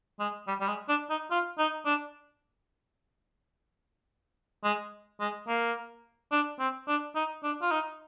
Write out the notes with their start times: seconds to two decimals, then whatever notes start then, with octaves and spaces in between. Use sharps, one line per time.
0.20 G#3
0.48 G3
0.61 G3
0.68 G#3
0.89 D4
1.10 D#4
1.31 F4
1.59 D#4
1.86 D4
4.64 G#3
5.20 G#3
5.48 A#3
6.32 D4
6.59 C4
6.88 D4
7.16 D#4
7.43 D4
7.62 F4
7.71 D#4